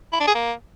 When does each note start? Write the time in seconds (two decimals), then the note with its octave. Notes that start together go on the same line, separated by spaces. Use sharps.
0.13 E4
0.20 D4
0.27 G#4
0.35 A#3